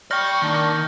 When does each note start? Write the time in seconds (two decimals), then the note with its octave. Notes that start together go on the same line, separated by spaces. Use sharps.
0.11 D5 G5 C#6 F6 G6 A#6
0.42 D#3 A#3 D4